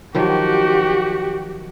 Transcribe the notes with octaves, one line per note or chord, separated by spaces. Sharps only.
D#3 F3 F#3 F#4 G4